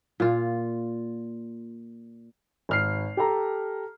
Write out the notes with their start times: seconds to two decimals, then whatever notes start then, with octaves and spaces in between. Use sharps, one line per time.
0.20 A#2 F4
2.69 G#1 F6 C7
3.17 G4 A4 A#5